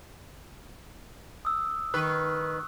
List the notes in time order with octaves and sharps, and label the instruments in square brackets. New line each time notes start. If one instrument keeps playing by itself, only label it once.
[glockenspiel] D#6 E6
[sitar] D#3 B4 [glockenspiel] C#6 F#6